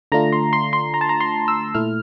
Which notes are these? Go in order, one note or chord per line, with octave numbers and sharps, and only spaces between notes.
D3 A3 D4 F4 A#5
C6
C6
C6
A#5
A5
A#5
C6
E6
A#2 A3 E4 F6